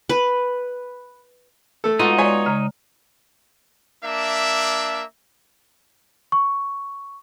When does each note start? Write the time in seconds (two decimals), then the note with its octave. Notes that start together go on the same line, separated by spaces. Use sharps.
0.09 B4
1.84 A3 A4
1.99 G#3 B3 D#4 F4 F#4
2.18 G#3 C#5 D5 G#5
2.46 C#3 G#3 A#5
4.04 A#3 D4 E5
6.32 C#6